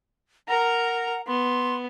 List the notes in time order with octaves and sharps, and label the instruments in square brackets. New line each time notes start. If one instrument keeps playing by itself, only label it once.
[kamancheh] A#4 A#5 [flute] F#5
[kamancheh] B3 [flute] C6